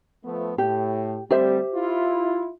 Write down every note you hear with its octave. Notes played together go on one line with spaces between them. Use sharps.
F3 A3 B3
A2 G4
D2 G3 C4 G4 C5 E5
E4 F4